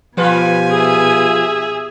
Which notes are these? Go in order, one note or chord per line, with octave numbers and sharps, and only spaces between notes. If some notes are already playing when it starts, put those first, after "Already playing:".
B2 F3 G3 F4 B4 G#5
G#4 E5